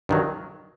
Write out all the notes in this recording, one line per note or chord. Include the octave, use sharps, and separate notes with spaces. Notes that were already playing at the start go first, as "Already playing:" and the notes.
G2 D#3 F#3